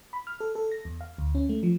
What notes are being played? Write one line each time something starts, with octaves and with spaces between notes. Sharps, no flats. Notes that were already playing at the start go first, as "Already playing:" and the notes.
B5
F6
A4
A4
A#6
E2
F5
D2
C#4
A3
F3